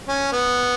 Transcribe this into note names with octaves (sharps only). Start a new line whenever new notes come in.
C#4
B3